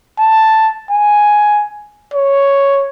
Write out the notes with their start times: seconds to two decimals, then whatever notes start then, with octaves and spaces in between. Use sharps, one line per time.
0.19 A5
0.91 G#5
2.14 C#5